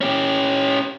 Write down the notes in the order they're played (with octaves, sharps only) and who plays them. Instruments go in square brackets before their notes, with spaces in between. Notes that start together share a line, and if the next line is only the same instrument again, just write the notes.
[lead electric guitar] C#4 G4